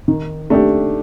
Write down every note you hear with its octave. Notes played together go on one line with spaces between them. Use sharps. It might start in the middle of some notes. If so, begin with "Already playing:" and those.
D#3
A3 D4 G4